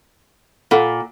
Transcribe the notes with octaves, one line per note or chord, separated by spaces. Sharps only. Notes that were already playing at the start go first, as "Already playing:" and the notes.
A#2 A4 F#5 B5